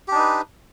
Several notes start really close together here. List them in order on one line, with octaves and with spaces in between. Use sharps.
G4 D4 D#4 B4